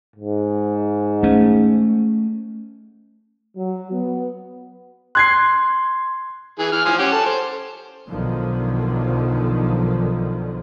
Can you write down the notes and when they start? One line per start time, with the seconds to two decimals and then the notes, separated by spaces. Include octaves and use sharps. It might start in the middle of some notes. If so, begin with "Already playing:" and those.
0.16 G#2
1.23 A3 C#4
3.57 F#3
3.91 B3
5.15 C6 F#6 G#6 C7
6.59 E3 G#4
6.72 E3 F6
6.86 F3 C5 G#5
6.99 C#4 G4 F#5
7.12 A4
7.26 C5
8.07 B1 D3 D#3 F3 F#3